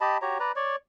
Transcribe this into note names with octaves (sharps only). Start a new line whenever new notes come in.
G4 D#5 A5 B5
F#4 G4 C#5 A#5
B4 D5 A#5
C#5 D5